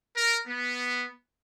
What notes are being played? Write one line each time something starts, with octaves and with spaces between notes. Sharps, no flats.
A#4
B3